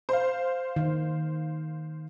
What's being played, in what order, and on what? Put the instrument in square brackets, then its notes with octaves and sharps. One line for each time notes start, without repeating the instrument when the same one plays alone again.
[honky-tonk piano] C5 F5
[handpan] D#3